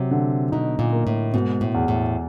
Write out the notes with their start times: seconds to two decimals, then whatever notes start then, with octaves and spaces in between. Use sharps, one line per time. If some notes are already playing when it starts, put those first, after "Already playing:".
Already playing: C3 F#3
0.11 D3
0.52 B2 D#4
0.79 A#2
0.93 A#3
1.07 A2
1.33 G#2 B2
1.61 A2
1.74 E2
1.88 A2